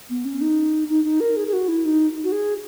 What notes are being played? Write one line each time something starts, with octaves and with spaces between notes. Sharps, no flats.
B3
C#4
D#4
D#4
D#4
A#4
G#4
G#4
F#4
E4
D#4
F#4
G#4